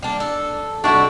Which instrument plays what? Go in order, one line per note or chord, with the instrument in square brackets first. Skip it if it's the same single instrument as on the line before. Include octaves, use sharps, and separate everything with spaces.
[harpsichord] G3 [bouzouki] A#3 D4
[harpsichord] D4 [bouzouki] A4
[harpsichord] B1 C3 C4 [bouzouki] G3 F#4 [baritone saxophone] D4 [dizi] C#6